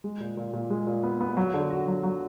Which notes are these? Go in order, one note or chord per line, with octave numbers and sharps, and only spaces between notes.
G#3
A#2
A#2
A#2
G#3
A#2
B3
B3
F#3
D3
F#4
F#3
F#3